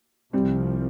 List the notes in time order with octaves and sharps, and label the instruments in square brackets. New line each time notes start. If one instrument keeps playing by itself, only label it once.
[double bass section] C2 C3 F3 [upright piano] G3 C4